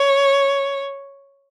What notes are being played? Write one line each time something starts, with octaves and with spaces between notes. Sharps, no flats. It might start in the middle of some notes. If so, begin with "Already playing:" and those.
Already playing: C#5